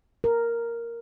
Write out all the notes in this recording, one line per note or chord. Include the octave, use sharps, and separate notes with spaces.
A#4